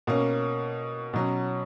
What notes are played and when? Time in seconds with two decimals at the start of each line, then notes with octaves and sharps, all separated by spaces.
0.07 B2 A#3 C#4
1.13 B2 F#3 C#4